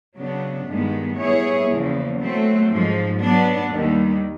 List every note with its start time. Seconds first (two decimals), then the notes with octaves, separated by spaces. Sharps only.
0.16 C#3 F#3 B3 D4
0.67 G2 D#3 G#3 B3
1.17 G3 B3 E4 G#4 C#5
1.68 E2 C#3 F3 A#3
2.19 F#3 A3 C4
2.69 G#2 F3 G#3
3.20 F#3 B3 D4
3.70 D#2 D#3 G3